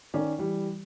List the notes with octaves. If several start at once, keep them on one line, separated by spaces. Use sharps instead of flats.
D#3 C#4 D5
E3 G3